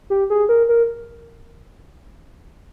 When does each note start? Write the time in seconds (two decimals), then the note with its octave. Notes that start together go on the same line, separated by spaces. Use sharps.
0.10 G4
0.30 G#4
0.49 A#4
0.69 A#4